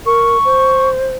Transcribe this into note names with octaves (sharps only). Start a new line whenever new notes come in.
A#4 C#6
C5